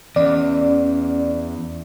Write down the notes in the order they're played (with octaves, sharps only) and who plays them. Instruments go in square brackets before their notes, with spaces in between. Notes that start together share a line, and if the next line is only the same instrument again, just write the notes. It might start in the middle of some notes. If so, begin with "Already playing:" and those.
[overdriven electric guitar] E2 [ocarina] C#4 [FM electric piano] D5